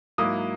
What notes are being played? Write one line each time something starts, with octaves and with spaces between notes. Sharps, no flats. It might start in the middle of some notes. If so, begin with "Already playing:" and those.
G#2 F#3 A#3 E4 D#6